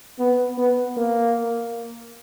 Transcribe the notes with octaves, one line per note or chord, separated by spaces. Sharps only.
B3
B3
A#3